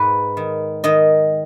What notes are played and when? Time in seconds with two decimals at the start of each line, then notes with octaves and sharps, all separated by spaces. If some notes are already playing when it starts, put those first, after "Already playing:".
Already playing: G#2 B4
0.37 D#3
0.84 D#3 D#5